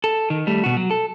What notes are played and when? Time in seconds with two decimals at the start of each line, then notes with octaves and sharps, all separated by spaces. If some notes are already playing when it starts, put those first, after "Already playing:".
0.04 A4
0.30 D#3
0.47 G3 A3
0.64 B2 F#4
0.77 F#3
0.91 A4